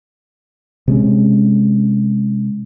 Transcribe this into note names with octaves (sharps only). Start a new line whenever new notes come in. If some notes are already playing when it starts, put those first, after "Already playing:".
C3 G#3 C#4